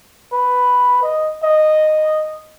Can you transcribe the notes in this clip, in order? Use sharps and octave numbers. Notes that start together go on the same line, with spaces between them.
B4
D#5
D#5